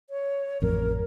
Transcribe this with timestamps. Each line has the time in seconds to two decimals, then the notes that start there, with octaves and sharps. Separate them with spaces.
0.10 C#5
0.62 A1 F2 A#4